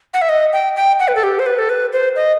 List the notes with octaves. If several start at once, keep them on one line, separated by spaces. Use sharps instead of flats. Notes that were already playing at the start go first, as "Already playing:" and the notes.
F#5
E5
D#5
G5
G5
F#5
B4
A4
G4
C5
B4
A4
B4
C5
D#5